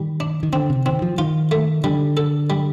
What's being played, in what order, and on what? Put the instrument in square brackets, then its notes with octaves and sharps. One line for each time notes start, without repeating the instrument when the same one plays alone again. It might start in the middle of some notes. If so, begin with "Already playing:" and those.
Already playing: [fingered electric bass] D#3 [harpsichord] G3
[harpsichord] D4
[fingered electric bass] D#3
[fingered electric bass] D3 [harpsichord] C4
[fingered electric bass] C3
[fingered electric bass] D#3 [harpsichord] C4
[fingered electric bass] F3
[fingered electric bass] D#3 [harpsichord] F4
[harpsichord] A3
[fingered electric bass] D3 [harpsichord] G3
[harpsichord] A4
G3